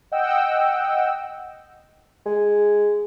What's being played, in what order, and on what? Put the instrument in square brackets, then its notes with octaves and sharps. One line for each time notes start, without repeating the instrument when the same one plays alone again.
[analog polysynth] D#5 F#5 G5 E6
[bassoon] G#3